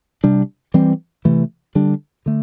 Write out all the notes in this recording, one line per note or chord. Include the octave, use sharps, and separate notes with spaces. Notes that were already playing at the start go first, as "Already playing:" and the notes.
C3 G3 D4
E3 G3 C4
C3 E3 A3
D3 G3 D4
D3 A3